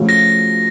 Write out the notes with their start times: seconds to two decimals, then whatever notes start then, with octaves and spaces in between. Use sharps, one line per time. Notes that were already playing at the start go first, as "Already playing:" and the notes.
Already playing: C#3 F3 A3 C#4 F#4
0.09 A#6